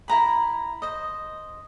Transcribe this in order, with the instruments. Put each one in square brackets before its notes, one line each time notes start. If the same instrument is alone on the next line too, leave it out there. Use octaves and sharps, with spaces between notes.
[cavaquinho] E4 A#4 A#5 B5
C5 D#5